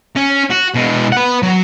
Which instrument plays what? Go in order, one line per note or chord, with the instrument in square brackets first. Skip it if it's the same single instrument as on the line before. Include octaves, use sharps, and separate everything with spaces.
[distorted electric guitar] C#4
F#4
B2 G#3
B4 F#5
F#3